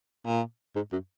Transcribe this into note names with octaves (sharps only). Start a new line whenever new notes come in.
A#2
G#2
F#2